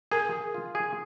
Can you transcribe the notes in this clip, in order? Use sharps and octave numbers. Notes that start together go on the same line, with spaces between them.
G#4 A#4
G#4
F4
G#4